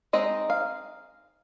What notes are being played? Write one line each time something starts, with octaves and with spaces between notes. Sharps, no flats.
G#3 C4 D#4 D#5
F5